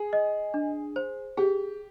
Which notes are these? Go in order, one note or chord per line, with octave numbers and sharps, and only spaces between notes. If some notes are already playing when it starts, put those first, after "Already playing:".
Already playing: G#4 G#5
D#5
D4
C5
G4 G#4